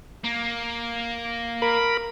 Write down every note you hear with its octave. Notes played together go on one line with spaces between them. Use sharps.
A#3
A#4 B5